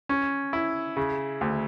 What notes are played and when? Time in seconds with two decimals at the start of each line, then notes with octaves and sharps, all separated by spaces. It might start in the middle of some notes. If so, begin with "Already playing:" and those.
0.09 C#4
0.53 E4
0.97 C#3
1.41 D2